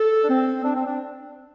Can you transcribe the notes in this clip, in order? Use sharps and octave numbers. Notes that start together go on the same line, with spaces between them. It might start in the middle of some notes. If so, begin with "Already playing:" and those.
Already playing: A4
D4
C4
D4
C4
D4